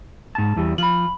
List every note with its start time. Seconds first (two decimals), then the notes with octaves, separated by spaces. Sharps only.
0.35 G#2 A5
0.56 E2 E3 G3
0.78 F3 B5 F#7